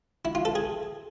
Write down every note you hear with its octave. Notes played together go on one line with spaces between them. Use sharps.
E4
F4
A4
G#4